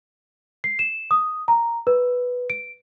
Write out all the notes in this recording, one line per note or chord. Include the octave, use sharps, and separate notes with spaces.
C7
E7
D#6
A#5
B4
D7